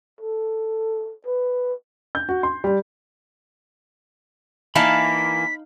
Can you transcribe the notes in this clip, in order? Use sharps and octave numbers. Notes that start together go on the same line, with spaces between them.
A4
B4
G6
F#4
C6
G3
E3 A#3 D#4 F5 A5 B5 B6